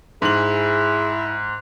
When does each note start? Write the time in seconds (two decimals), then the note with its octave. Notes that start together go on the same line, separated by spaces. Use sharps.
0.22 G#2 E4 G#4 F#7